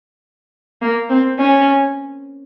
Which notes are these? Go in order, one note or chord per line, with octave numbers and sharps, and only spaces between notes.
A#3
C4
C#4